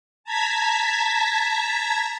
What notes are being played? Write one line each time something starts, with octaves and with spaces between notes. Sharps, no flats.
A5 A#5 G#6 B6